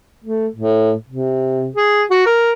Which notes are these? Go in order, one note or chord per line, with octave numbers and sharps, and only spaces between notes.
A3
A2
C3
G#4
F#4
A#4